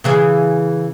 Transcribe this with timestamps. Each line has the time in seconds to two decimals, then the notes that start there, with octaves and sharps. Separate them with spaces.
0.04 C#3 E3 G#4